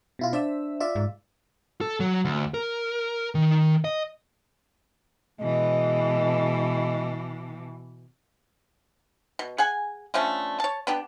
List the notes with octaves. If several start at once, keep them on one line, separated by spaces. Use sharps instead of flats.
B2 E4 F4
D4 C5 E5 E6
F4 D5 E5
G#2
A4
F#3
D2
A#4
D#3
D#5
B2 E3 G#3 D#5
B2
G#4 F#5 G#5
D3 F3 A3 C#4
C#5 A5
B3 D4 G4